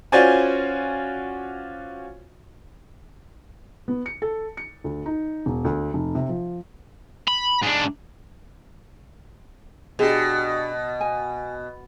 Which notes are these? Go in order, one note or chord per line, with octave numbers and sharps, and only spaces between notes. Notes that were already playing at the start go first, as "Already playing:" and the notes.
C#4 F4 F#4 C5 D5 G#5
B3
C#7
A4
C#7
D2
D#4
E1
D2
F1
C3
F3
B5
G#2 D4
B2 D4 G4 G#4
G#5